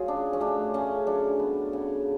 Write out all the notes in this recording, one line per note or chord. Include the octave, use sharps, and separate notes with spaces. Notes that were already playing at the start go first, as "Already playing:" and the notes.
Already playing: F#3 F4 G#4
C#3 D4
C#4
A3 D4
C#3 C#4
F#3 D4
B3
C#3